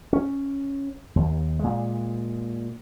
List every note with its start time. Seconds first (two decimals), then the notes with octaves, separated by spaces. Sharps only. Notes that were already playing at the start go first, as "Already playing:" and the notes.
0.13 C#4
1.16 D#2
1.59 A#2 G#3